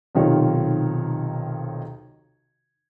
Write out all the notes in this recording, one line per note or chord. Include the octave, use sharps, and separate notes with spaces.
B1 C3 D#3 F4 C#5